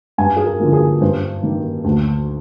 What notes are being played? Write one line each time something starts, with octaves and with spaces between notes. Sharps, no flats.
G2 G#5
G#4
A#4
D3 F3 A#3
G#4
G2 C5
D#3 A#3
D2